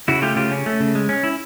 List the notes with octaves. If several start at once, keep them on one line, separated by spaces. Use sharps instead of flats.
C#3 E4 F#4
A3 F4 G4
C#3 F4 G4
C#4
A3
C#3
G#3
C#4
E4